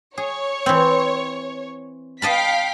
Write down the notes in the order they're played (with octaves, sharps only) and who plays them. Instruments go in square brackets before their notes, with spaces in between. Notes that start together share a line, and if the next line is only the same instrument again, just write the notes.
[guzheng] G#4 [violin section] C#5
[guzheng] E3 C4
[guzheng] D#5 A5 B5 [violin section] F5 G5 B6